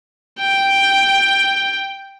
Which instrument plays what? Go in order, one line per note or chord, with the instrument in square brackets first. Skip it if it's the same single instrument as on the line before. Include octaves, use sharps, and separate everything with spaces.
[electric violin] G5